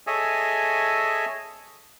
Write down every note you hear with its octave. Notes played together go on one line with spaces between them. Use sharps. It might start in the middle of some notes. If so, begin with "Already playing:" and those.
G#4 A4 C#5 D#5 E5 G#5